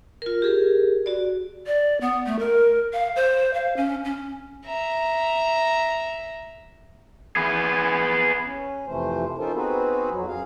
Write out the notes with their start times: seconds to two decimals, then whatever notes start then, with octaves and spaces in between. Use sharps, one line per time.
0.22 F4 A#4
0.42 G4 G#4 A#4
1.06 F#4 D5
1.66 D5
2.01 B3
2.26 A3
2.39 A#4
2.93 F5
3.16 C5
3.54 F5
3.76 C#4
4.05 C#4
4.67 E5 A#5
7.36 B3 G#4
8.45 C#4
8.87 F2 C3 E3 A3 C5
9.38 C#4 D#4 F4 A4 A#4 C5
9.55 B3 C4 D#4 F#4 G#4 B4
10.11 F2 F#3
10.27 F#2 G#4 F5